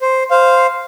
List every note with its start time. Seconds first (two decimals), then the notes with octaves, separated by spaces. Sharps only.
0.01 C5
0.31 C5 F5